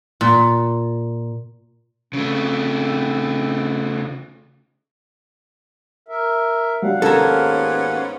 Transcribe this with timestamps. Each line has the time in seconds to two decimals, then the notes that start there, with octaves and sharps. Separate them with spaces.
0.21 A#2
2.13 C#3 A3 C4
6.08 A#4 E5
6.82 D#2 F#3 G3 D4 F5 F#5
7.02 G#2 B3 C#4 A4 A#4 G#6